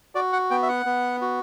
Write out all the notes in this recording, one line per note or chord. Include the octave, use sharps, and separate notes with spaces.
F#4 D5
F#5
B3 G5
E5
F#5
B3
F#4